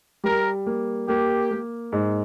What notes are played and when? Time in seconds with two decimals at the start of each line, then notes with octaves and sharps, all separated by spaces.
0.24 G3 A#4
0.67 A#3
1.08 A#3 G4
1.51 A#3
1.92 G#2